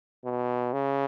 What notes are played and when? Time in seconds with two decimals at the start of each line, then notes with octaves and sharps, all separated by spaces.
0.25 B2
0.73 C#3